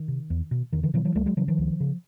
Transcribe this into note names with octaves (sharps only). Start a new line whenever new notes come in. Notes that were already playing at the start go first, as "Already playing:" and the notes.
Already playing: D#3
C3
E2
B2
E2 D#3
D3 E3
B2 E3 F#3
E3 F#3
C#2 G3 A3
F#3 G#3
C#3 E3 F#3
D#3 F3
C#2
C#3